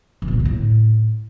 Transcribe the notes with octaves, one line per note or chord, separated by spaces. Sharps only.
E3
A#2
A#3
D#3
A2